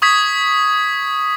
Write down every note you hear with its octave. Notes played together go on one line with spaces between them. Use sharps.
C#6 D#6 G#6 B6